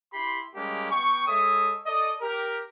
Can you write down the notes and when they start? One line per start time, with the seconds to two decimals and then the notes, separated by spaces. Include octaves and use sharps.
0.12 E4 G4 B5 C6
0.55 G3 G#3 A#3 C#4 G4
0.89 B3 G5 C#6
1.27 G#3 A4 C#5 E5 D#6
1.85 A4 D5 D#5
2.20 G4 A#4